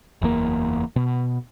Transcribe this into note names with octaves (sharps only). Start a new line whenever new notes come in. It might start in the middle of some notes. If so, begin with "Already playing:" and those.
F#1 E2 A#2 A#3
B2